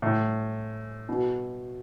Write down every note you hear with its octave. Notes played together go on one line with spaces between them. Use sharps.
A2
B2